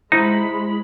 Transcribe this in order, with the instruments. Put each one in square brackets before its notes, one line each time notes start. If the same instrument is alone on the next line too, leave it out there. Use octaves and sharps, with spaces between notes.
[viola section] G#3 B5 [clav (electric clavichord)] D#4 [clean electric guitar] E4 C5 A#5